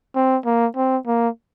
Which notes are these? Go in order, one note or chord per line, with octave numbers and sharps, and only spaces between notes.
C4
A#3
C4
A#3